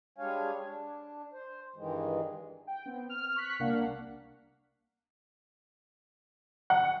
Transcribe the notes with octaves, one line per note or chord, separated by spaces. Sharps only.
G3 G#3 D4 C#5 F5 G#5
D4
C5
G2 D#3 E3 G#3
G5
B3 C4
F6
C#6 F#6 B6
C2 A#3 D4 F5 F#5
F#5